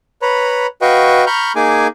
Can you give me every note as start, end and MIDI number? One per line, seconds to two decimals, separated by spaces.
0.22 0.67 71
0.22 0.67 73
0.22 0.67 82
0.22 0.67 83
0.82 1.25 66
0.82 1.25 71
0.82 1.25 75
0.82 1.25 77
0.82 1.25 79
0.82 1.25 85
1.27 1.52 82
1.27 1.52 83
1.27 1.52 85
1.27 1.52 89
1.27 1.52 91
1.56 1.87 58
1.56 1.87 63
1.56 1.87 68
1.56 1.87 80
1.56 1.87 86